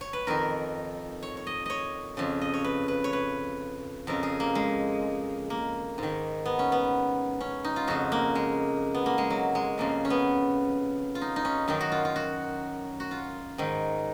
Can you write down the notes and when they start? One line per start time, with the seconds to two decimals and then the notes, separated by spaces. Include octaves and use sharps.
0.01 C#5
0.13 B4
0.27 F2 D#3 A#4
1.23 C#5
1.37 C#5
1.47 D#5
1.66 C#5 D#5
2.17 F2 C#3
2.41 D#5
2.54 C#5
2.64 B4
2.88 B4
3.04 C#5
3.13 B4
4.07 F2 C#3 A#4
4.23 G#4
4.40 A#3
4.55 G#3
5.50 A#3
5.98 G#2 D#3
6.46 B3
6.59 C#4
6.72 B3
7.40 C#4
7.64 D#4
7.76 F4
7.87 F2 C#3 F#4
8.12 A#3
8.35 G#3
8.94 B3
9.06 A#3
9.18 G#3
9.30 F#3
9.55 G#3
9.78 F2 C#3 A#3
10.05 C#4
10.10 B3
11.15 F4
11.22 D#4
11.36 D#4
11.45 C#4
11.68 F#2 D#3 D#4
11.81 F#4
11.92 F4
12.05 F4
12.16 F#4
13.00 F#4
13.11 F4
13.58 G#2 D#3